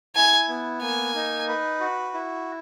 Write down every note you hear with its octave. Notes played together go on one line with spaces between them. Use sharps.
E4 G#5
B3
A#3 G#5
D#4
B4
F#4
E4